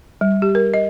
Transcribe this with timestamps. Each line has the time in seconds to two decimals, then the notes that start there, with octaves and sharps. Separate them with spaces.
0.21 G3
0.42 G4
0.55 A#4
0.74 D#5